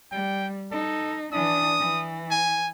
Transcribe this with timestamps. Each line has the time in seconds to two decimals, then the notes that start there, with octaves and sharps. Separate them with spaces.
0.11 G3 G5
0.72 D#4 A4
1.32 E3 D4 D#6
1.79 E3
2.31 G#5